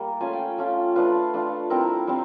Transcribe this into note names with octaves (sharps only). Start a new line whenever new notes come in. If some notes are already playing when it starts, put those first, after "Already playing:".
Already playing: G3 A#3
A3 C#4 F4 G#5
G5
A3 C#4 F4
A3 D4 F4 B4
A3 D4 F4
G3 C4 E4 A#4
G3 C4